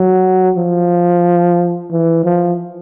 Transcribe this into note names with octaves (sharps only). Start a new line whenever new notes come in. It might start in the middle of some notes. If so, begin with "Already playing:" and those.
Already playing: F#3
F3
E3
F3